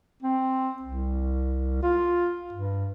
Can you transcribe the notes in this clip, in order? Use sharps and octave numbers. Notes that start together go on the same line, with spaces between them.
C4
C2
F4
G2